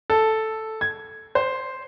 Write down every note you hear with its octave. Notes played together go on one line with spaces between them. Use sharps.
A4
G#6
C5